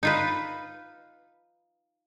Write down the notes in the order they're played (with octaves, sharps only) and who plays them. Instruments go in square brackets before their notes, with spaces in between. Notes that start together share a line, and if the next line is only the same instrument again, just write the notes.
[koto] D#4 F4 B4